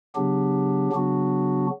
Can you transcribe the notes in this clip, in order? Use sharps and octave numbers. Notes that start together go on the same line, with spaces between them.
C#3 F#3 B3 D4 G4
C#3 F#3 B3 D4 F#4